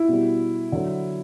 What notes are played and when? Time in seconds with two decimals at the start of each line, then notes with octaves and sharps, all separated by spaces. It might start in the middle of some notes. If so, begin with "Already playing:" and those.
Already playing: E4
0.08 B2 G3
0.72 D3 F#3